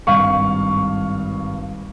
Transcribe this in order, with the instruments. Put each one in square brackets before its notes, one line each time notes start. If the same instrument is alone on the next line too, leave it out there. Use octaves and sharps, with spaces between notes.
[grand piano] G#1 G2 F5 C#6